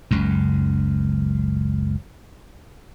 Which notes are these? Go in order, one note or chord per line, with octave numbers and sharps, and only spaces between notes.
F#1 C#2 F#2